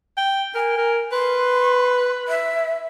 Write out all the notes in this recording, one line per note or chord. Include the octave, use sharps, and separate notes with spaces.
G5
A#4 G#5
A#4
B4 C6
E5